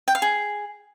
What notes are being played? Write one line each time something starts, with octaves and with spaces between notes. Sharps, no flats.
G5
F5
G#4